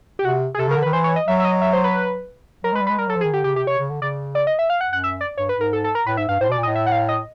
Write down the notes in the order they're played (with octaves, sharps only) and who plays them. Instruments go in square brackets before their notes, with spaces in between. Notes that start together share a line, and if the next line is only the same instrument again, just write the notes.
[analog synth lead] G4
[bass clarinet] C3 [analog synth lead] F#4
[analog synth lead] G#4
[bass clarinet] C3 [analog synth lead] A4
[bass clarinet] C#3
[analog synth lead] A#4
[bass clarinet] D3
[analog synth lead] B4
[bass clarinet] D#3
[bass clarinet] E3 [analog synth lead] C5
[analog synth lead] C#5
D#5
[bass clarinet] F#3 [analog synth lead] E5
[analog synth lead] E5
D#5
E5
C5
B4
[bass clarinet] F#3 [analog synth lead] A#4
[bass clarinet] G#3
[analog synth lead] B4
[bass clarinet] G3
[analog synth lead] B4
[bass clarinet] G#3
[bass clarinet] G3 [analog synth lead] A#4
[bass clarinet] F#3 [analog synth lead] A4
[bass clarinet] F3
[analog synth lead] G#4
[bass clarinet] D#3
[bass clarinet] D3 [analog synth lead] G4
[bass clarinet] C#3 [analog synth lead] G4
[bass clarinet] C3 [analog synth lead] G4
[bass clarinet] C3 [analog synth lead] C#5
[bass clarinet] C#3
D3
[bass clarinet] C#3 [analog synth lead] D5
[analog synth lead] D5
D#5
E5
F5
F#5
[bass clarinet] F#2
[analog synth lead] F#5
E5
D5
[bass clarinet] G2 [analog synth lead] C#5
[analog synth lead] B4
[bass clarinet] G#2
[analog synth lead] A#4
A4
A4
A#4
[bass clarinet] A2 [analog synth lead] B4
[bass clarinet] G#2 [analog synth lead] E5
[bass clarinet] G2 [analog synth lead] F5
[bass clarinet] A2 [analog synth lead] C5
[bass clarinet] B2 [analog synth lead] D5
[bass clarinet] A#2
[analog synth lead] D#5
[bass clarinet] A2
[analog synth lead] E5
F#5
F5
D#5